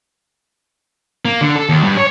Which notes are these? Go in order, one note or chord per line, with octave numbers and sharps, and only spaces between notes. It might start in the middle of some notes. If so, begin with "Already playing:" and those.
A#3
D3
A4
D#2
G2
C#5